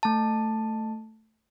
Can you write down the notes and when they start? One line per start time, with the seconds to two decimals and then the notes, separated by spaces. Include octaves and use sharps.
0.03 A3 A5